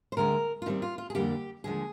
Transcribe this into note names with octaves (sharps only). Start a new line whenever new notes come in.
C5
D2 D3 G#3 C4 A#4
F4
D#2 D#3 G3 C4 D#4
F4
F4
G#4
F2 D3 G3 A#3 G4
D#2 D3 F3 G#3 G#4